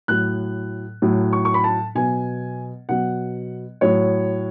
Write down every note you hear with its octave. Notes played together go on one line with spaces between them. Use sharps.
A2 F#3 F#6
A2 F#3
C#6
C#6
B5
A5
B2 F#3 G#5
B2 F#3 F#5
A2 F#3 C#5